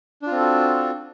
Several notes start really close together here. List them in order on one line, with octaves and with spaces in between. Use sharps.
D4 F4 C4 A4 F#4